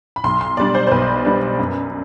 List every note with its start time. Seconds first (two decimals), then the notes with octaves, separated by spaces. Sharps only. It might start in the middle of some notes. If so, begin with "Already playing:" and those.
0.16 B5
0.24 B1 C6
0.41 C6
0.57 B2 G3 D4 D5
0.75 C5
0.87 C5
0.91 B1 B4
1.25 B2 G3 D4
1.59 F#2